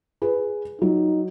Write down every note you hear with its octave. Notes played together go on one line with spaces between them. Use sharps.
G#4 B4
F#3 D#4